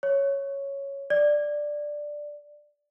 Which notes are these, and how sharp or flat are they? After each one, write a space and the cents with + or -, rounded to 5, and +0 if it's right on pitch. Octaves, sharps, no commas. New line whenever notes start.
C#5 +0
D5 +5